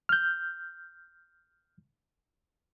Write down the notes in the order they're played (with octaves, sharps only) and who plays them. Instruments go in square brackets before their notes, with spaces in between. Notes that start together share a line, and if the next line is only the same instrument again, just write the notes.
[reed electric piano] F6 G6